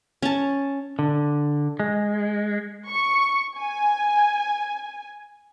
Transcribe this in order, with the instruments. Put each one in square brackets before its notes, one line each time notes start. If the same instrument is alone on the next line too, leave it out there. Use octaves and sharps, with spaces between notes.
[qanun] C#4 A5
[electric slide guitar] D3
G#3
[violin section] C#6
G#5